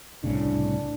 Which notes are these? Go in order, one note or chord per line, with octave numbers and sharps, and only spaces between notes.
C2 A2 C#3 D4